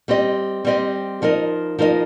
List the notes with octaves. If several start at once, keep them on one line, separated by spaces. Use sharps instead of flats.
G3 C4 G4 D#5
G3 C4 G4 D#5
F3 D#4 A#4 D#5
F3 D#4 A#4 D#5